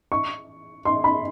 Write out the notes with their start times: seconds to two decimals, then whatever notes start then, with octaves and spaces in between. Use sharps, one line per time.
0.12 C#6
0.85 C6
1.04 B5